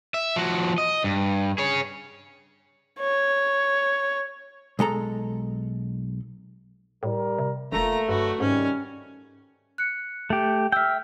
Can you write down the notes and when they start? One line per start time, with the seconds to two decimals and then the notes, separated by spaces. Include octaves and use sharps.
0.14 E5
0.36 F3 F#4
0.78 D#5
1.04 G2
1.58 G#4 C#5
2.99 C#5
4.79 B1 G#3 A4 A#5
7.03 A2 G3 A#4
7.39 C3
7.72 E1 A#2 A3 A#3 F4 A#5
8.09 G2 D3 F#3 F#4 B4
8.40 G#2 C3 D#3 G3 C#4
9.78 F#6 C#7
10.30 A3 G4
10.72 E5 G5 E6 F6